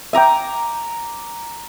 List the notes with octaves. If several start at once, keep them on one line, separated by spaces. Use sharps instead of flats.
E5 G5 G#5 A#5 D6